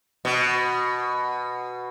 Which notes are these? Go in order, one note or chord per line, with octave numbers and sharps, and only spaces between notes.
B2